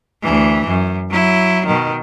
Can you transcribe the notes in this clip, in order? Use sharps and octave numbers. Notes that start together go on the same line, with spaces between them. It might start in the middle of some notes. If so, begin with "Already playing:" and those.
D2 E3
F#2
F#3 E4
B2 D#3